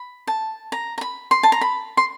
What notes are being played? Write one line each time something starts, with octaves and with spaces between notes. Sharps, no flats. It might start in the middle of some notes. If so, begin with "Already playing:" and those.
Already playing: B5
A5
A#5
A#5
B5
C6
A5
A#5
B5
C6